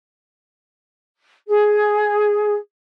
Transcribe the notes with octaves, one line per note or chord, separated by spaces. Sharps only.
G#4